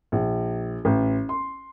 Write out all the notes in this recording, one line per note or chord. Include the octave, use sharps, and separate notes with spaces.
A#1
A1
C6